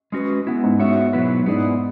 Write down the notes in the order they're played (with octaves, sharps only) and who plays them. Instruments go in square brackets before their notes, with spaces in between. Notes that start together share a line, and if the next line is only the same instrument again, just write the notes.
[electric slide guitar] G#3 C#4 F#4 B4
G#3 B3 E4
[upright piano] G#2
[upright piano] G#2 [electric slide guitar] B3 F#4 C#5 E5
[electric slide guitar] B2 F#3 B3 E4 B4
[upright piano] G#2 [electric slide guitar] B3 E4 G#4 D5